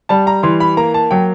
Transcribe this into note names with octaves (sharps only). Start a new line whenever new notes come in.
G3 A5
A#5
E3 C6
B5
A#3 A#5
A5
F#3 G5